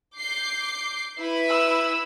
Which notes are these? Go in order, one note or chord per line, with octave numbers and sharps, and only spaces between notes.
D6 G6 C7
E4 B4 B5
E6